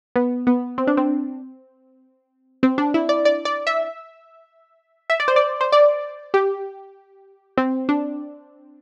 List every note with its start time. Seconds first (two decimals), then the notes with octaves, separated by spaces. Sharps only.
0.16 B3
0.47 B3
0.78 C4
0.87 D4
0.97 C4
2.63 C4
2.78 D4
2.94 E4
3.09 D5
3.25 D5
3.45 D5
3.67 E5
5.10 E5
5.20 D5
5.28 C5
5.36 D5
5.61 C5
5.72 D5
6.34 G4
7.57 C4
7.89 D4